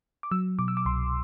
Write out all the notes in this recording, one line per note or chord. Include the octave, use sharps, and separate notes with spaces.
D6
F#3 E6
B2 D6
E6
D6
C2 C6